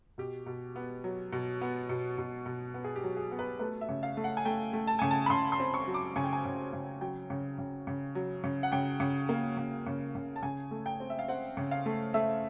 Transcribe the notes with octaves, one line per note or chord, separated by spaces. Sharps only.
B2 G4
B2
B3
F#3
B2
B3
B2
B2
B2
B3
G#4
G4
F#3
G#4
B3
B4
A3 B4
E5
C#3
F5
A3
F#5
G#5
A3 G5
A3
A5
C#3 G#5
A5
B5
C#3 C6
C6
C4
C#6
F#3
D6
C#3 G#5
G5
G#5
C#3
C#3
F#3 G5
C#3
C#3
C#3
F#3
C#3
F#5
C#3 G5
C#3
A#3
C#3
C#3
C#3
A5
C#3 G#5
A3
G5
C4
E5
F5
C4 F#5
C#3
F5
A3
A3 E5